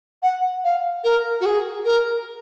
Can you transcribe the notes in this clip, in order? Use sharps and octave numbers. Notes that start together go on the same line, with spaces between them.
F#5
F5
A#4
F#4
G#4
A#4